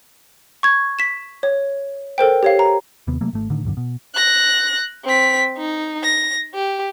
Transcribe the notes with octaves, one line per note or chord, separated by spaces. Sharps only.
C#6 G#6
B6 E7
C#5
A4 A#4 C5 G5
G4 C#5 F5
A#5
D#2 C3 B3
C3 F#3 A3 A#3
G#1 A3
A2 D3 D#3
D#1 G#1 F#2 D3
B2
F#6 A#6
C4 B6
D#4
A#6
G4